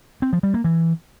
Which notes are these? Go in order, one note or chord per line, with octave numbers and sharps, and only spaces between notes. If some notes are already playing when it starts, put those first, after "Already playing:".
C4
F3
G3
A#3
E3